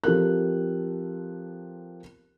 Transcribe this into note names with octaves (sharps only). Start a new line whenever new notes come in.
F3 C4 G4 A4 A#4 F#6